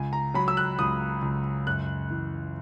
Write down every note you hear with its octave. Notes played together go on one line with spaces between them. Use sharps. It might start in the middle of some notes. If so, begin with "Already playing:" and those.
Already playing: C#2 G#5
A#5
F#3 B5
E6
F#6
C#2 D#6
C#2
F#2 F#6
E3